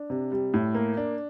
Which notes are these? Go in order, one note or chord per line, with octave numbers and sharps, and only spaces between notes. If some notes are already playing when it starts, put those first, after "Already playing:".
Already playing: D4
C3
G3
A2
A#3
D4